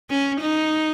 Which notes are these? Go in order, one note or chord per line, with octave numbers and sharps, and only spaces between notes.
C#4
D#4